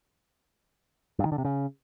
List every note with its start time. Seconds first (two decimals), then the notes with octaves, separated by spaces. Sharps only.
1.19 G2
1.25 D#3
1.32 D3
1.38 C3
1.45 C#3